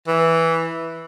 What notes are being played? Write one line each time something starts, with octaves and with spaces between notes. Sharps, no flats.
E3